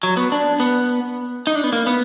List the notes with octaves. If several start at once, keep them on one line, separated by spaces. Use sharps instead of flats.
F#3
B3
D4
B3
D#4
D4
B3
A#3
B3